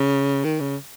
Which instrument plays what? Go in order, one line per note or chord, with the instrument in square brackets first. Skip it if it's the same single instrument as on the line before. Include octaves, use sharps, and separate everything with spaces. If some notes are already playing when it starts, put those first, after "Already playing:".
Already playing: [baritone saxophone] C#3
D#3
C#3